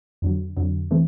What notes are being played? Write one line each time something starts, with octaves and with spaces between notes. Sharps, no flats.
F2 D3 F#3
F2 D3 F#3
E3 A3 C4